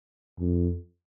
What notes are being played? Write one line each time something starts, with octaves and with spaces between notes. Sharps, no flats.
F2